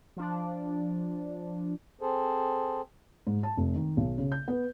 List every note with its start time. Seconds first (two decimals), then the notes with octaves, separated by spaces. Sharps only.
0.17 F3 D4
2.01 C4 G#4 A4 C5
3.27 G#2
3.43 A5
3.57 F1
3.76 D#3
3.97 B1
4.18 C#3
4.32 G6
4.48 B3